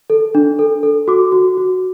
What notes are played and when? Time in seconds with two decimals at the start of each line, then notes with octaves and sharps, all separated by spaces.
0.10 A4
0.35 D4
0.59 A4
0.83 A4
1.08 F#4 D6
1.32 F#4
1.57 F#4